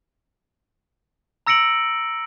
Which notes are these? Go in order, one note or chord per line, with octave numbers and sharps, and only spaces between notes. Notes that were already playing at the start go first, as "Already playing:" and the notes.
A#5 E6 A#6 C#7 D7 F#7